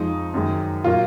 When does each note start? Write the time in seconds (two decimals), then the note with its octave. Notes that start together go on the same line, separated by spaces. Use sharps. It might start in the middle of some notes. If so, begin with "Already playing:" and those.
Already playing: F2 F3 G#3 D#4
0.34 F#2 D#3 G#3
0.84 A#2 F#3 A#3 F4